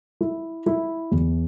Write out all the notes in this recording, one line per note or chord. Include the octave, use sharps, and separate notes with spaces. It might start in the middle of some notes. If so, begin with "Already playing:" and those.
E4
E4
E2